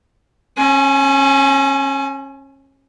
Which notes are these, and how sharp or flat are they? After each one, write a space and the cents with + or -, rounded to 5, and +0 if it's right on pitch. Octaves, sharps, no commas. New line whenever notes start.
C#4 -30 G#5 +25